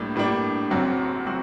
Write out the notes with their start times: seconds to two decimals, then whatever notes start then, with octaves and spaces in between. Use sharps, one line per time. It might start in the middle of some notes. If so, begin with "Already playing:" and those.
Already playing: A2 G3 A#3 D4
0.16 A2 G3 A#3 D4
0.71 F#1 F#2 F#3 C4 F#4
1.26 F#3 C4 F#4